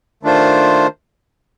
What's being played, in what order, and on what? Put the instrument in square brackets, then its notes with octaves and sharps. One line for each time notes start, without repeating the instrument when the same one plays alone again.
[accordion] D#3 A3 D4 F4 C5